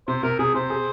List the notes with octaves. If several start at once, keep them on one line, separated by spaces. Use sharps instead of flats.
C3 C5
C3 A#4
C3 G#4
C3 C5
G#4